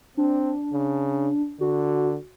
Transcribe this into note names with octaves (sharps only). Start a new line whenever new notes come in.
C4 D4
C#3
D3 F#4